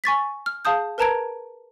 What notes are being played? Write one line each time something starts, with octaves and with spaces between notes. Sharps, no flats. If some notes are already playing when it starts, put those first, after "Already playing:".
G#5 C#6 A6 B6
F6
G#4 F5 A5 D#6 G6
A#4 B4 A5 A#5 G#6 D7